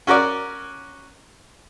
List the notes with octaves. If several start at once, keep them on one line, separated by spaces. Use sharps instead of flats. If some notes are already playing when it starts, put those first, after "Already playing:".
C#4 F#4 A#4 D5